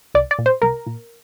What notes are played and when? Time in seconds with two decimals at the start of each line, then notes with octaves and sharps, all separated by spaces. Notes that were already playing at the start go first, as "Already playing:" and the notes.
0.15 C2 D5
0.31 D5
0.39 A#2
0.46 C5
0.62 C2 A#4
0.86 A#2